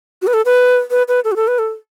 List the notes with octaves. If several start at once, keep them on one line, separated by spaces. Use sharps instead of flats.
F#4
B4
A4
B4
B4
B4
A4
F#4
A4
B4
A4